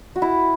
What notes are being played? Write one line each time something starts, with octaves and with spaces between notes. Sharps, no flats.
F#4
E4